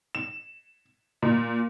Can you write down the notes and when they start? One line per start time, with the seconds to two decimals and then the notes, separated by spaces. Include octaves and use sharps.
0.15 E7
1.22 A#2